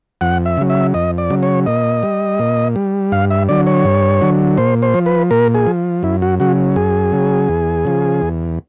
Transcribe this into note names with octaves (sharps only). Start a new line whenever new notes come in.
F2 F#5
E5
C#3 F#3
E5
F2 D#5
D5
C#3 F#3
C#5
A#2 D#5
G3
A#2
G3
G2 F5
E5
D3 F#3 D5
C#5
G2
D3 F#3
A#2 C5
C5
F3
B4
A#2 A#4
G#4
F3
F#2 E4
F#4
C#3 F#3 F#4
F#2 G#4
C#3 F#3
E2
C#3 F3
E2